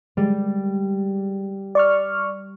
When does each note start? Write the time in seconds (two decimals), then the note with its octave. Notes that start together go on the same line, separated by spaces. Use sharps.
0.17 G3 G#3
1.75 D5 C#6 F6